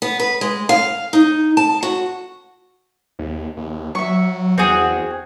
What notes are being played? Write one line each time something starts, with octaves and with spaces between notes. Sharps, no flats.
B3
B4
G#3
F5
D#4
A5
F#4
D#2
D#2
F#3 E5 C#6
E2 C4 F#4 G#4